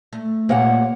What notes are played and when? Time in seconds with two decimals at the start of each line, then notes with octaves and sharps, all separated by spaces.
0.13 A3
0.49 A#2 A#3 G4 C#5 F#5